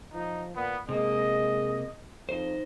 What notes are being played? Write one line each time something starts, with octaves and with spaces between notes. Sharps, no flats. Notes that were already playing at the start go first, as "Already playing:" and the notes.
F3 D#4
A#2 B3
C3 G#3 A#3 D#5
F2 D#4 C5